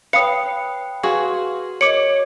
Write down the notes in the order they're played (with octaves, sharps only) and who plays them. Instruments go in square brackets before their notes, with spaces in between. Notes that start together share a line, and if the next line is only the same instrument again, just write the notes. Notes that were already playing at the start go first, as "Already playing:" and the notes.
[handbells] B4 [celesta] C#5 G5 B5 [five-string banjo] F5 [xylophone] D#6 C7 C#7
[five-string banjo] F#4 G#4 [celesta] B4 C6 [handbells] F5
[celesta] A#4 D#5 [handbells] C#5 [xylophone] D6 C#7